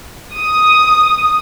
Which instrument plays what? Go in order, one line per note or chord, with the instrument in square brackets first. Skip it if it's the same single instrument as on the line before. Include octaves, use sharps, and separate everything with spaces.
[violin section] D#6